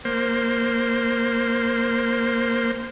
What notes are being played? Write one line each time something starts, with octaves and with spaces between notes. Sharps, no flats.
A#3 C5